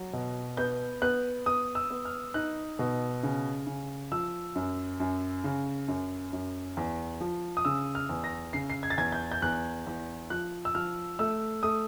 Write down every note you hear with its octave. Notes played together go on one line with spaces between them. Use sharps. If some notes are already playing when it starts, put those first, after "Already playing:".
Already playing: F#3
B2
B3 G6
B3 F#6
B3 D#6
E6
B3
F6
D#4 F#6
B2
C#3
C#3
F3 E6
F#2
F#2
C#3
F#2
F#2
E2
F3
D#6
C#3 E6
F6
E2
A#6
C#3 C7
C7
G#6
A6
E2 G#6
G6
G6
E2 F#6
E2
F3 F#6
E6
F3 F6
A3 E6
A3 D#6